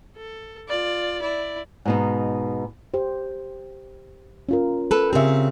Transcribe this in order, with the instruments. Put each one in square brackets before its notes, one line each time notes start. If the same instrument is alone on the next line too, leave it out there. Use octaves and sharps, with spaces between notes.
[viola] A4
F4 D5
E4 D5
[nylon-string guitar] G#2 B2 D#4
[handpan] G4 C5
C#4 F4 A#4
[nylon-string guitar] A4 B4
[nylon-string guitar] C#3 C4 [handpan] G4 A#4 E5